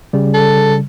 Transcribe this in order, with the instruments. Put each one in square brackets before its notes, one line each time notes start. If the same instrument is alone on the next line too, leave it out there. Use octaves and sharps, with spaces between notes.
[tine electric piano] C#3 G3
[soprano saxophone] A4